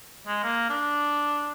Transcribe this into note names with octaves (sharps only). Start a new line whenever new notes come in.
G#3
A#3
D4